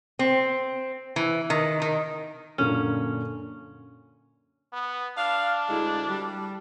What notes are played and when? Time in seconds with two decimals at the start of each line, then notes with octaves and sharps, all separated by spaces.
0.19 C4
1.16 E3
1.50 D#3
1.82 D#3
2.58 F#2 A#2 D3 C#4
4.73 B3
5.18 D4 F5
5.70 D2 G#3 E4
6.09 G3